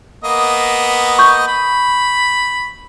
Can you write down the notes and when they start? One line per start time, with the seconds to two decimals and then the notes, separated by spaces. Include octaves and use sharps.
0.24 A#3 B3 D#5
1.19 C#6 G6
1.48 B5